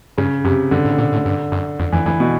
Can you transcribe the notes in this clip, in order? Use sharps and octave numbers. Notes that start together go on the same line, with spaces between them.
G2 C#3
F#2 C3
G2 D3
A2
A#2
A2
G2
F#2
F2
F2 E3
F2 E3
B2